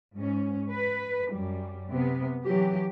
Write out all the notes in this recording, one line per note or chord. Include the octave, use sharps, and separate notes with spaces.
G#2 C#4
B4
F#2 G3
C3 B3
E3 F#3 G4